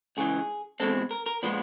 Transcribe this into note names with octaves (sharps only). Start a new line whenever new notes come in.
C#2 C#3 E3 G#4
E2 B2 G#3 C4 A4
A#4
A#4
A#2 F3 G#3 B3 B4